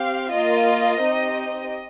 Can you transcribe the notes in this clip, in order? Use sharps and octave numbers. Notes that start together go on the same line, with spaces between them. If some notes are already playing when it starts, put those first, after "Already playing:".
Already playing: C4 G4 F5
A#3 F4 D#5
C4 D#4 G4